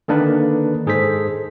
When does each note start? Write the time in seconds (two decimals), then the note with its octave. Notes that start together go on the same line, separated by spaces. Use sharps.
0.08 D3 D#3 A#3 D4 D#4 B4
0.86 G#2 G#4 A4 C5 B6